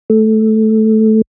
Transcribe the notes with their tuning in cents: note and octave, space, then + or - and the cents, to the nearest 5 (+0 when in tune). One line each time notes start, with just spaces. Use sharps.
A3 -10